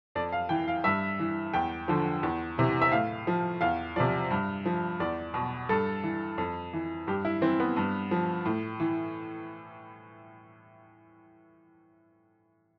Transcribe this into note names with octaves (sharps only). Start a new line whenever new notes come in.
F2 D5
F5
E3 G5
F5
G2 E5
E3
E2 G5
D3 F3
E2
C3 E3
E5
A2 F5
F3
E2 F5
C3 F3 D5
G2
F3
E2 D5
B2
G2 A4
E3
F2
E3
G2 G4
E4
E3 C4
B3
G2
F3
A2
E3